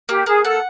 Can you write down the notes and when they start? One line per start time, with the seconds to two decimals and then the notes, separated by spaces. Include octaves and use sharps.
0.09 A#3 G4
0.26 A#3 G#4
0.44 A4 F#5